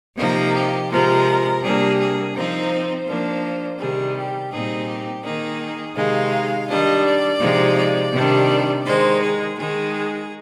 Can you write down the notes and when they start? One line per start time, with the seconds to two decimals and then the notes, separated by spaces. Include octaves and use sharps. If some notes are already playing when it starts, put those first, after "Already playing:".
0.17 C3 F3 A#3 D#4 A#4
0.54 G4
0.89 C3 F3 G#3 A#4
1.62 C3 G3 A#3 D4 G#4
1.98 G#4
2.34 F3 C4 D#4 A#4
2.70 C5
3.07 F3 A#3 D4
3.79 C3 D#3 G3 G#4
4.15 G4
4.51 A#2 G3 C4 D#4 G#4
4.88 G4
5.23 D#3 A#3 D#4 G#4
5.95 C3 D#3 G#3 D#4 F5
6.68 D#3 G3 D4 D#5
7.04 D5
7.40 C3 F3 G#3 D#4
7.76 D5
8.12 C3 D#3 G3 D4
8.85 D#3 G#3 D#4 C5
9.21 G#4
9.57 D#3 G#3 D#4 G#4
9.93 G#4